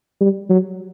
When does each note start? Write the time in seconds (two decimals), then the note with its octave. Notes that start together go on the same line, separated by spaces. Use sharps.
0.20 G3
0.50 F#3